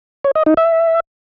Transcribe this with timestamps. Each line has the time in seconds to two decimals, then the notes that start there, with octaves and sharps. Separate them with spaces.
0.24 C#5
0.35 D#5
0.46 D#4
0.57 E5